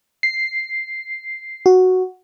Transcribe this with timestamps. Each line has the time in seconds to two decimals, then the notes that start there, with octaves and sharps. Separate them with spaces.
0.23 C7
1.66 F#4